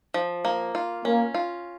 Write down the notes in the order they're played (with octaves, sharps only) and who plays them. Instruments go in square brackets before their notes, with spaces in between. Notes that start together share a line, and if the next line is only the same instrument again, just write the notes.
[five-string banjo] F3
A#3
F4
[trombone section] A#3 [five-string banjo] C#4
[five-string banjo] F4